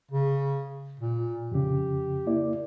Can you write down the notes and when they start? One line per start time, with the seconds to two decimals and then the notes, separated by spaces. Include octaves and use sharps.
0.11 C#3
1.00 A#2
1.52 F2 C#3 G4
2.27 A#3 E4 D5